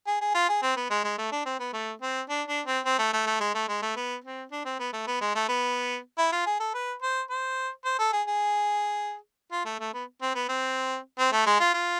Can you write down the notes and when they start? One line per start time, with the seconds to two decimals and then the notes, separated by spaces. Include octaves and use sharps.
0.07 G#4
0.21 G#4
0.34 F4
0.49 G#4
0.63 C4
0.77 B3
0.90 G#3
1.04 G#3
1.18 A3
1.32 D4
1.46 C4
1.60 B3
1.73 A3
2.02 C4
2.29 D4
2.48 D4
2.66 C4
2.85 C4
2.99 A3
3.13 A3
3.27 A3
3.40 G#3
3.54 A3
3.68 G#3
3.82 A3
3.96 B3
4.24 C4
4.52 D4
4.65 C4
4.79 B3
4.93 A3
5.07 B3
5.21 G#3
5.35 A3
5.49 B3
6.18 E4
6.32 F4
6.46 G#4
6.60 A4
6.74 B4
7.02 C5
7.30 C5
7.85 C5
7.99 A4
8.13 G#4
8.27 G#4
9.52 F4
9.65 A3
9.80 A3
9.94 B3
10.21 C4
10.35 B3
10.49 C4
11.19 C4
11.32 A3
11.46 G#3
11.60 F4
11.74 F4